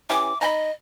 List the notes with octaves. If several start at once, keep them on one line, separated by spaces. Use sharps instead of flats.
E3 C#4 G4 D6
D#4 D#5 G#5 B5